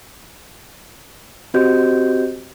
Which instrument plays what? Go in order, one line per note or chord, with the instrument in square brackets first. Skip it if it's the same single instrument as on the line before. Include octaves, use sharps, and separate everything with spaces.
[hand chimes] C4 F#4 G4 C5 D#5 G6